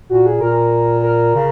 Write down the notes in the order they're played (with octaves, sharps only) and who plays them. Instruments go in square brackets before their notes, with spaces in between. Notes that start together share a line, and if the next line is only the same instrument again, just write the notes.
[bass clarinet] A#2 [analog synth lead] F#4
[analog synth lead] G#4
[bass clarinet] A#2 [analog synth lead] A#4
[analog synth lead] A#4
[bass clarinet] C#3